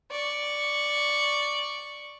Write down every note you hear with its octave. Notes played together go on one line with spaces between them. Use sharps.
D5 C#6